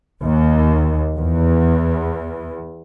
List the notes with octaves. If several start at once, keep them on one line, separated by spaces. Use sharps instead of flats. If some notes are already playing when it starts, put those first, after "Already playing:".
D#2
E2